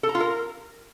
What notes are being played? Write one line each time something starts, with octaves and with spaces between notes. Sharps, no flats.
A4
A#5
F4
A#4